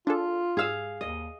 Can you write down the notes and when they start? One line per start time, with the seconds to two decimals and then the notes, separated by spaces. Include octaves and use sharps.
0.07 D4 F4 G#4 A4
0.57 G#2 G#4 F5 E6
1.01 D#2 D#5